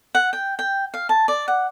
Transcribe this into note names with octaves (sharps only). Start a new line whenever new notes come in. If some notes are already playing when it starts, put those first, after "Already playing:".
F#5
G5
G5
F5
A5
D5
F#5